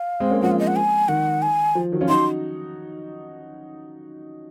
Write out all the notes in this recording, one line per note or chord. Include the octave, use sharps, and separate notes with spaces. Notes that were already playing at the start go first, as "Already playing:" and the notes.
Already playing: F5
G#3 C4
A#3 C#4
F3 G#3 F#5
F5
D#5
F#5
G#5
D#3 F#5
G#5
F3
D#3 F#3
C#4 F4
D#4 F#4 C6